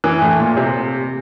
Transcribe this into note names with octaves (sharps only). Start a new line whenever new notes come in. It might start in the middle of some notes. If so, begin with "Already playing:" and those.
E3
A2
A#2
C3